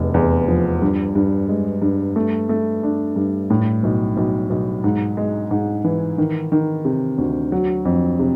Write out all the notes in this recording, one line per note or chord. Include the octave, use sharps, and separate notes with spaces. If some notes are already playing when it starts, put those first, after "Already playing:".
Already playing: F1 E2
E2
F3
G2
G2
G#3
G2
A3
A3
D4
G2
A2
B1
B1
B1
G#2
G#3
G#2
E3
D#3
D#3
C3
D2
F#3
F2
C3